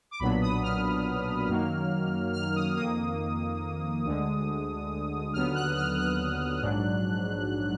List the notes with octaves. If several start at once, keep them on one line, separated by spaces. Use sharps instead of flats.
D6
B1 A#2 F#3 B3 D4 B5
D#6
F6
F#2 D#3 F#3 A#3
F6
D#6
F2 D#3 A#3 D#6
D2 D3 G#3
D#2 D3 F#3 B3 F6
F#6
F6
F#6
A#1 G#2 F#3 D4